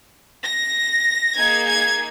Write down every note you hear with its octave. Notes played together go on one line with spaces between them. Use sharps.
A#6
A#3 D#4 G#4 G#6
G#6